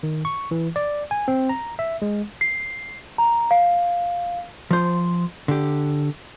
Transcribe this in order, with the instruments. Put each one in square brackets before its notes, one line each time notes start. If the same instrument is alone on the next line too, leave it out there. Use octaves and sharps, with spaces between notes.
[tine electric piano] D#3
C#6
E3
D5
G#5
C4
A#5
E5
G#3
[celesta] C7
A#5
F5
[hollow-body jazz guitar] F3 C5
D3 G4